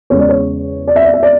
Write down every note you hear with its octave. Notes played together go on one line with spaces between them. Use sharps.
E2 C#3 G#3 C#5
D5
C#5
D5
E5
D5
E5
D5